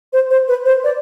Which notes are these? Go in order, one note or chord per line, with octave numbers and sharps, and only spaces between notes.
C5
C5
B4
C5
D5